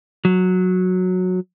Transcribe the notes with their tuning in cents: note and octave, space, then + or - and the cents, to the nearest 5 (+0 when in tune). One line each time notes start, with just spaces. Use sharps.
F#3 -10